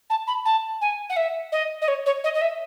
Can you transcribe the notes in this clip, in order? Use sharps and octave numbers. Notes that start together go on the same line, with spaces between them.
A5
B5
A5
G#5
F#5
E5
D#5
D#5
C#5
C#5
D#5
D#5
E5